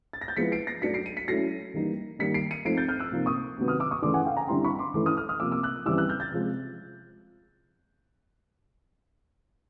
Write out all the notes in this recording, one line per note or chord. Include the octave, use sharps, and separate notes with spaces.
A6
A#6
G6 A6
F3 G#3 B3 E4 B6 C#7
C7 D7
A#6 C7
F#3 A3 D4 B6 C#7
C7 D7
C#7 D#7
B6 C#7
F#3 A3 C#4 E4 A#6 C7
E3 G3 A#3 D#4
D#3 G3 A#3 B6 C#7
C7 D7
C#7 D#7
F3 A3 C4 D#4 C7 D7
G6 A6
F6 G6
E6 F#6
C3 F3 A#3 D#4
C#6 D#6
C3 D#3 F#3 B3
D#6 F6
D6 E6
C#6 D#6
C#3 E3 A3 D4 C6 D6
F#5 G#5
F5 G5
G#5 A#5
D3 G3 C4 E4 A#5 C6
B5 C#6
C6 D6
E3 A3 C#4 E4 C6 D6
D#6 F6
D#6 F6
D#6 F6
C3 F3 A#3 D6 E6
D6 E6
E6 F#6
C#3 E3 G3 C4 E4 D6 E6
E6 F#6
F6 G6
G6 A6
C3 F3 G#3